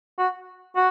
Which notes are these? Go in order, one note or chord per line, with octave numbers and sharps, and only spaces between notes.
F#4
F#4